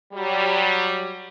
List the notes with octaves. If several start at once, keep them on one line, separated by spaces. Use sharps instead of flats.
F#3 G3